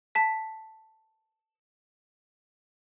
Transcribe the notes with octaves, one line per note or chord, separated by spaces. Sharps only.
A5 B6